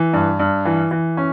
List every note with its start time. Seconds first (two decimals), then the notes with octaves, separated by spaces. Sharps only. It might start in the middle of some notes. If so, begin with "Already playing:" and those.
Already playing: E3
0.13 G2
0.39 G2
0.65 E3
0.91 E3
1.17 C#4